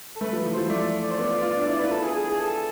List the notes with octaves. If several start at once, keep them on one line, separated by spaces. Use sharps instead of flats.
A4
A3 B4
F3
E3
F3 C5
A3 D5
D5
C5
B3 D5
F4
F4
D4
E4 D5
F4
B4
E4
A4
G#4
G#4
G#4
A4